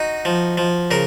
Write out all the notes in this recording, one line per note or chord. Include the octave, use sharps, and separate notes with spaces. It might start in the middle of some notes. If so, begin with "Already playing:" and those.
Already playing: D#4 F#4
F3
F3
C#3 A#4